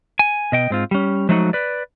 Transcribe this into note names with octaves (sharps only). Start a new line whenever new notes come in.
G#5
B2 D#5 G5
G#2 C4 F4
G3 C#4
F3 F#3 G#3 A3 D#4 F#4
B4 D5